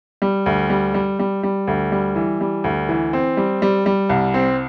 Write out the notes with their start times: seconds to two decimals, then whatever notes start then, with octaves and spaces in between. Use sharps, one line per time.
0.22 G3
0.46 D2
0.70 G3
0.94 G3
1.19 G3
1.43 G3
1.67 D2
1.92 G3
2.16 E3
2.41 G3
2.64 D2
2.89 E3
3.13 C4
3.37 G3
3.62 G3
3.86 G3
4.09 C2
4.34 C4